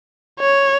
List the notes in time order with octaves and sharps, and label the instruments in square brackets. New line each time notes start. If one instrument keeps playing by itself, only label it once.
[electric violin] C#5